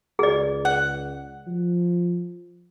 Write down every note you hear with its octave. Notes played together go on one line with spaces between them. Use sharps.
C#2 G#4 D5
F#5
F3